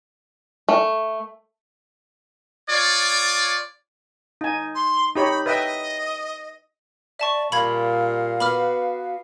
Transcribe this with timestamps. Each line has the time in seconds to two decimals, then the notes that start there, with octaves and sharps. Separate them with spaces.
0.69 A3
2.68 F4 C#5 D5
4.41 D#4 G#5
4.75 C6
5.15 D#4 G4 C#5 B5
5.46 B4 D#5 E5 G5
7.19 D5 E5 A5 C#6
7.52 A#2 G3 F5 B5 G#6
8.40 B3 F#4 B4 B5 D6 F6